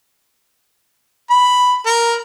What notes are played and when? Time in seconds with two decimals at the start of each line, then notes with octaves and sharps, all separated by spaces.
1.30 B5
1.86 A#4